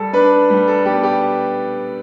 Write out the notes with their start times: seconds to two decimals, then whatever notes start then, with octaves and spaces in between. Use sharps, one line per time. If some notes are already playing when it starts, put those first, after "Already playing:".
Already playing: G3 A4
0.13 D4 B4
0.50 G3
0.68 A4
0.85 B3 G4
1.03 G4